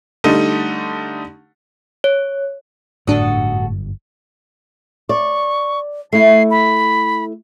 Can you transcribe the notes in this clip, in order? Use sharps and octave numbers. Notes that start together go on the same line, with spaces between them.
D3 G3 A3 D#4
C#5
G1 F#2 A2 D4 F#4 A4 D#6
D5 C#6
A3 E4 C7
B5